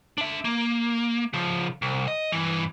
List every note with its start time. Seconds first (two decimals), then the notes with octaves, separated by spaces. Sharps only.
0.18 D4 E5
0.45 A#3
1.33 C#3 F3
1.82 C2
2.08 D#5
2.32 G2 E3